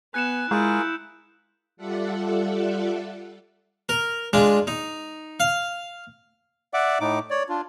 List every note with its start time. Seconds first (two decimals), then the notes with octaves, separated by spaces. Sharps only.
0.14 B3 G#5 F#6 C#7 E7
0.51 G#3 E4 F4 G#4 A#4 G6
1.77 G3 F4 A4 D5 E5 F#5
3.89 A#4
4.33 G#3 D4 F4
4.67 D#4
5.40 F5
6.74 D5 E5 F#5 D6
7.00 A2 D#4 D6
7.30 C#5 D5
7.49 D4 F4